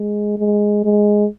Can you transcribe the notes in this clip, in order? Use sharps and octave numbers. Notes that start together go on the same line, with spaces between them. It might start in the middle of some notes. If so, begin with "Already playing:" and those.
Already playing: G#3
G#3
G#3